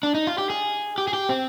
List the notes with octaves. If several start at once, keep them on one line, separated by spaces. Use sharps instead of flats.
D4
D#4
F4
G4
G#4
G4
G#4
G4
C4